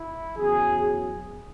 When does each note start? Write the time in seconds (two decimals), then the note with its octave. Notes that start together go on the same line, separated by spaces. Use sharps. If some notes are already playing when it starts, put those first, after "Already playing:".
Already playing: E4
0.36 E2 C#3 F#3 G#4
0.82 G#4